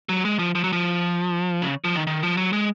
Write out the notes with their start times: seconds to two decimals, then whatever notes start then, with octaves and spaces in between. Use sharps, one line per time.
0.09 F#3
0.25 G#3
0.39 F3
0.55 F3
0.64 F#3
0.73 F3
1.62 C#3
1.84 F3
1.96 D#3
2.07 D#3
2.23 F3
2.37 F#3
2.53 G#3